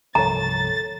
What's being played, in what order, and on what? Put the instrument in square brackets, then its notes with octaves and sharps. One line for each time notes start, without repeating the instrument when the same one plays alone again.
[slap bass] G1 C2 F3 [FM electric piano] A4 A#4 C#5 [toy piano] A#5 [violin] A6